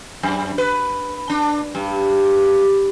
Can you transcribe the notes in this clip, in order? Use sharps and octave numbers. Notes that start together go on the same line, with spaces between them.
F#2
B4
D4
G2